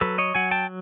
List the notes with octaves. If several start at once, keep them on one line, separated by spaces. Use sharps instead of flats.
F#3 A4 B4
C#5 D#5
F#3 F#5 G#5
G5 A5